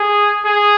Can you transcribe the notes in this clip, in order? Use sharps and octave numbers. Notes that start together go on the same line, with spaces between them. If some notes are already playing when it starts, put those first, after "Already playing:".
Already playing: G#4
G#4